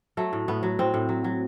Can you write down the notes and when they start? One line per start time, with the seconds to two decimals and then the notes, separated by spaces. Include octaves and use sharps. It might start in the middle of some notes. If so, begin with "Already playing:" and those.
0.17 F#3 A3
0.33 A2
0.48 A2 B3
0.63 F#3
0.79 A2 C4
0.94 A2
1.09 F#3
1.24 F#3